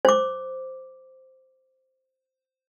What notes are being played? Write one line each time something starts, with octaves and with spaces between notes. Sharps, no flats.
C5 D6